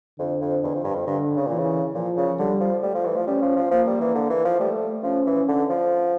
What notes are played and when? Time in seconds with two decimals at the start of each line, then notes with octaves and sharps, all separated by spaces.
0.18 F2 D3
0.41 F2
0.63 E2
0.74 F2
0.84 G2
0.95 F2
1.07 G2 D3
1.36 C#3
1.47 A#2 E3
1.58 C#3
1.95 A#2 F3
2.17 C#3
2.39 D3 G3
2.61 F3
2.83 G3 A3
2.95 F3
3.06 E3
3.16 F3
3.27 G3 C#4
3.42 F3
3.56 F3
3.71 F3 A#3
3.87 G3
4.01 E3
4.15 D3
4.30 E3
4.45 F3
4.60 G3 A3
5.03 F3 C#4
5.26 E3
5.48 D3
5.70 F3